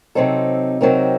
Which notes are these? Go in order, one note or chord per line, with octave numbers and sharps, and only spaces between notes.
C3 F#3 C4 D#4 A4
C3 F#3 C4 D#4 A#4